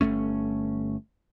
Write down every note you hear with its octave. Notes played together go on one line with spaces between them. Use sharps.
G1 G2 A3 C#4